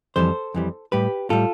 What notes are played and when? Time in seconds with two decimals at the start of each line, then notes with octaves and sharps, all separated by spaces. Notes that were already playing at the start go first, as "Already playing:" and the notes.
0.16 F2 E3 G3 A4 C5
0.54 F2 E3 G3
0.92 A2 G3 G4 B4
1.30 A2 G3 F4 A4